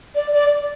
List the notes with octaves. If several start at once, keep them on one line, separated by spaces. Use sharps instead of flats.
D5
D5